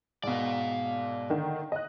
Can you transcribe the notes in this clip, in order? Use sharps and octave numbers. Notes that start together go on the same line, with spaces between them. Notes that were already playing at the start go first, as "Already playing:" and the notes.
G#2 B2 D5 F5
D3 D#3
D#5 F#6